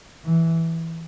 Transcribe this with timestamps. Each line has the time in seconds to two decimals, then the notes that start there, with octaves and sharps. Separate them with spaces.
0.25 E3